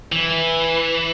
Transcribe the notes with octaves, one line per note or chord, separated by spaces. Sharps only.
E3